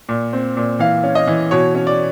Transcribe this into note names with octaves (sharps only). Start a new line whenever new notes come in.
A#2
C4
A#2
E3 F5
C#4
D#5
E3
B2 C#5
C#4
D5